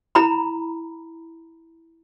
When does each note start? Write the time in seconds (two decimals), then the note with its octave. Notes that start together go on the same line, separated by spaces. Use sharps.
0.15 E4 A#5 B5